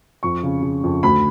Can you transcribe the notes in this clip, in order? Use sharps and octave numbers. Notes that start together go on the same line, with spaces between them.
F2 C#6
C#3
C#3
F2
D2 B5